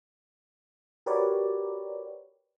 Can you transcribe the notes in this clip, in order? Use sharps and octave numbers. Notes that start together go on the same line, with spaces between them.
F#4 G4 A#4 B4 C#5 D5